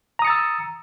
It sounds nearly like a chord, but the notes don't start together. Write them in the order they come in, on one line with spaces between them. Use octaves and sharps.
A#5 D#6 C#7 A6 E6